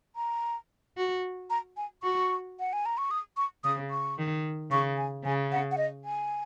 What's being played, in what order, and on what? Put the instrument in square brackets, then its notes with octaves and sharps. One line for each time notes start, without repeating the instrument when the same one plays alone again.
[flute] A#5
[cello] F#4
[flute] A#5
G#5
[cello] F#4 [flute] C#6
[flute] F#5
G#5
A#5
C#6
D#6
C#6
[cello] C#3 [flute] D#6
[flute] C#6
[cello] D#3
[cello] C#3 [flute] C#6
[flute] G#5
[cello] C#3 [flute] G#5
[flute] F#5
F#5
D#5
G#5